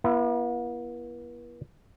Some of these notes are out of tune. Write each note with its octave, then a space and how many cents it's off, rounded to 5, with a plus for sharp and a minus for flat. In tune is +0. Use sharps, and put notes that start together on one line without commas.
B3 -45 E4 +25